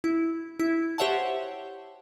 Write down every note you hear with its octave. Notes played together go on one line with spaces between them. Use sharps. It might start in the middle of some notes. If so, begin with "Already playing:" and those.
E4
E4
G4 C5 C#5 E5 F#5 A5